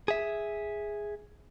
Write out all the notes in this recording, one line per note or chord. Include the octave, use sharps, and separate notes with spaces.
G#4 E5